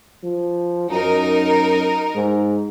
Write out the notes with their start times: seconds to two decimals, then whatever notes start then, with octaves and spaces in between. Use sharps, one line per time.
0.24 F3
0.90 F#2 D#4 A#4
2.15 G#2